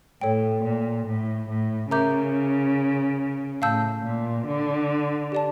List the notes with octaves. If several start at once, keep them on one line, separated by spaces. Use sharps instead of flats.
A2 A4 C#5 G5
A#2
A2
A2
C#3 A#4 E5 A#5 D6 G6
A2 F5 A5 E6 G6
A#2
D3
G4 D5 A5